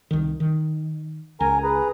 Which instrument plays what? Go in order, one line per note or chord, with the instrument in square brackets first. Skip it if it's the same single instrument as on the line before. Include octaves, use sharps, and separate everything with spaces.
[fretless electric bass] C2 D#3
D#3
[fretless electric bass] C#2 [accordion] A#4 G#5 A#5
[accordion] G#4 B4 A#5